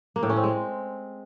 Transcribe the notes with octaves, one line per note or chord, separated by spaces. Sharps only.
A#3
A2
C#4
C4
G#3